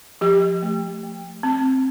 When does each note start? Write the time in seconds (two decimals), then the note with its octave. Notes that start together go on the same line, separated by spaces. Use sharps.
0.21 F3 G4
0.62 A3
1.03 A3
1.43 C4